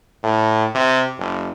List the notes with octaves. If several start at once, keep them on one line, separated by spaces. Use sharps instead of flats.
A2
C3
F#1